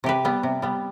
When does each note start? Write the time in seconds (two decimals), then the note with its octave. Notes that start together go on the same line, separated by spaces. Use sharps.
0.04 C3 G4 B4
0.25 G3 B3
0.43 C3
0.62 G3 B3